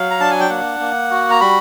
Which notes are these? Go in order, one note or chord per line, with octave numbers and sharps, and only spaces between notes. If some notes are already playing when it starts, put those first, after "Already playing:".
Already playing: F#3 F5
A#5
D4 A5
G#5
G5
A#3 F#5
A#3
F#4
A#5
G3 B5